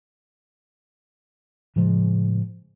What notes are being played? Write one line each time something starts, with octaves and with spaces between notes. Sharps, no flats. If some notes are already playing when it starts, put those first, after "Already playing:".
A2 C#3 F3 G#3